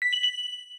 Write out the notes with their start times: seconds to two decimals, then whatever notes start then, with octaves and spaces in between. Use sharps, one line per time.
0.02 B6
0.13 F#7
0.23 F#7